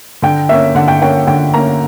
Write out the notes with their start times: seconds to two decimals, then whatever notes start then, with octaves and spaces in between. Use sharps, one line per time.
0.22 D3 G5
0.49 A#3 C#4 E5
0.75 D3 F#5
0.88 G5
1.01 A#3 C#4 G5
1.27 D3 G5
1.54 A#3 C#4 A#5